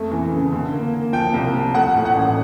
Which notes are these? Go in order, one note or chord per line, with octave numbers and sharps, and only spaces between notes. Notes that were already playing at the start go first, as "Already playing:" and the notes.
Already playing: F2 A3
E3
C#3
D3
A#3
A#3
F3 G5
C2
F3
A3 F#5
A2
F#5
A1